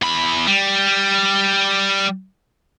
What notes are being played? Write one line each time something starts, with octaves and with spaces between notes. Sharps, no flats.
E2 B5
G3